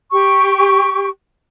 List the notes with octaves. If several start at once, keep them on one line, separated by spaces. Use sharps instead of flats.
G4 C#6